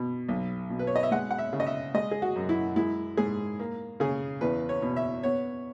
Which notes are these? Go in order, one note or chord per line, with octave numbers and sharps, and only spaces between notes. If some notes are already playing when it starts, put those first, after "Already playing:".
Already playing: B2
B1
B2
B4
C#5
D#5
E5
G#3 F#5
F#5
E5
C#3
D#5
E5
G#3 D#5
G#4
F#4
F#2
E4
G#3 E4
G#2 G#4
A#3
C#3 G#4
E2 B4
C#5
B2
E5
B3 C#5